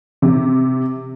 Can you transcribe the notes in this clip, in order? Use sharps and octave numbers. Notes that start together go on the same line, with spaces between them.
C3